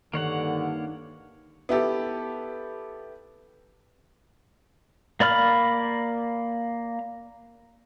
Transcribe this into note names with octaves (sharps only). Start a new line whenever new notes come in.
G2 D3 D#3 A#3 C#5 F#5
B3 E4 G4 A4
A#3 D5 B5 F6